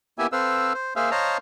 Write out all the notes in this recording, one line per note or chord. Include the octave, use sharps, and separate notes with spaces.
A#3 B3 E4 G4 E5 G#5
C4 A4 B4 C5 F5 E6
C5
A#3 G#4 C5 E5 F5
C5 C#5 D#5 F5 A5 A#5